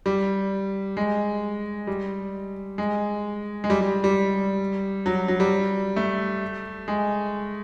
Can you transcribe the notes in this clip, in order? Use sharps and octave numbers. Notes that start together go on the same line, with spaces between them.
G3
G#3
G3
G#3
G#3
G3
G3
G3
F#3
F#3
G3
A3
G#3